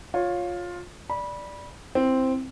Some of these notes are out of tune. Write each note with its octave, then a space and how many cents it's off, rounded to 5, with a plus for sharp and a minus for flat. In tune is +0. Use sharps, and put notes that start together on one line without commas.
F4 +15 C#5 +0
D5 +0 B5 -20
C4 +0 E4 +0